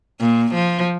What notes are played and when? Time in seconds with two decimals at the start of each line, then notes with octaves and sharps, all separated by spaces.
0.20 A#2
0.54 F3